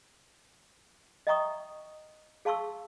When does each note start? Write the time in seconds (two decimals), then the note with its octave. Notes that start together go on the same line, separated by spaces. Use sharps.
1.27 D#5 E5 G5 A#5 C#6 D#6
2.45 G#4 F5 A5 C6 C#6 E6